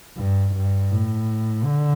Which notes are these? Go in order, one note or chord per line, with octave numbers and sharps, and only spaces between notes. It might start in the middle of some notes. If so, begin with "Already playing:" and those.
G2
G2
A2
D3